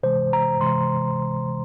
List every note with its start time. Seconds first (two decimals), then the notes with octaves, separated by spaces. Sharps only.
0.03 C3 E3 G#3 C5
0.33 A#5
0.61 C3 E3 G#3 C6